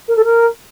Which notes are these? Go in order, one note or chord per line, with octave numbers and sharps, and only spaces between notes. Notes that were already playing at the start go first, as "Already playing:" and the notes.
A#4
A4
A#4